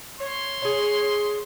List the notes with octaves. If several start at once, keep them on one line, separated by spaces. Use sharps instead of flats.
C#5 C6
C#4 G#4